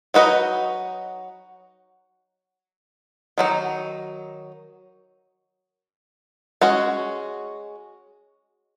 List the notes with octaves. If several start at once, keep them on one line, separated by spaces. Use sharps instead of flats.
F#3 D#4 F#4 B4 D#5
D#3 F#3 D#4
G#3 C#4 F#4